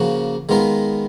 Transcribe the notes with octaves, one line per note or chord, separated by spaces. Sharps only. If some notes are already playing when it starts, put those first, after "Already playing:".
Already playing: C#3 F3 A#3 C#4 F#4
D#3 G#3 B3 F4 A#4